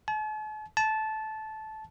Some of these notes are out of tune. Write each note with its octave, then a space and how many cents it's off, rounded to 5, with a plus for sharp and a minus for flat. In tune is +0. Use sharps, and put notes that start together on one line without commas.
A5 -45
A5 -15